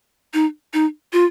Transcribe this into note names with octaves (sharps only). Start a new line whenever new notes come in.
D#4
D#4
F4